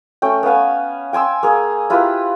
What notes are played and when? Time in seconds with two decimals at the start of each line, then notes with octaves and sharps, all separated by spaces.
0.22 A3 C#4 G5
0.43 B3 B4 F5 G#5
1.13 G5 G#5 C6 E6
1.43 A#3 G#4
1.90 E4 F4 G4 B4